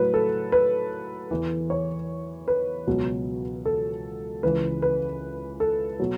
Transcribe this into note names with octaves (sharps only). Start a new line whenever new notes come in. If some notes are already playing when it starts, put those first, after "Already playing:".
Already playing: A2 F#3 B4
A4
B4
E2 E3
C#5
B4
C#2 B2 F#3
A4
C#2 C#3 E3 B4
B4
A4
B2 F#3